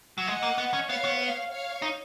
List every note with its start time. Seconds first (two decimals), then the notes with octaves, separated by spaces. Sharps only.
0.18 F#3
0.27 G#3 D#5 F#5
0.43 A#3
0.58 B3
0.73 C#4
0.89 B3 C#5 F5
1.04 B3
1.20 C#5 F5
1.51 C#5 F5
1.82 D#4